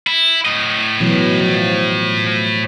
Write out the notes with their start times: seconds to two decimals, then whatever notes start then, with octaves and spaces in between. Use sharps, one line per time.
0.07 E4
0.45 A2 D#5
1.00 B2 E3 F#3
1.41 F3